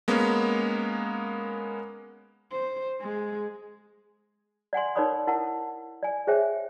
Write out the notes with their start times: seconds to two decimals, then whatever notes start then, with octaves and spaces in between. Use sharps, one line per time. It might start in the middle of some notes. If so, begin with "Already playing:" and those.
0.08 G#3 A#3 B3 C#4
2.52 C5
3.01 G#3
4.73 D5 F#5 G#5 C6
4.96 D#4 A#4 C#5 D5 B5 D#6
5.27 E4 A#4 F#5 A5
6.03 D5 G#5
6.27 G#4 C5 C#5 E5 G5 G#5